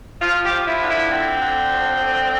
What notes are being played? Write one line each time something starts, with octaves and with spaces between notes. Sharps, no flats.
F3 F4
G4
F3
E4
D3
E4
D3 C4
D3
F3
D3